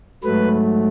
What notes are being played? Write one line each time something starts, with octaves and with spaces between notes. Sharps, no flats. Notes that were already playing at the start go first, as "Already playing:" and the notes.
G#2 F#3 A3 B4